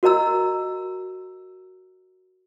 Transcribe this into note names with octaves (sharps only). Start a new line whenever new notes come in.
F#4 A#4 D#5 A#5 E6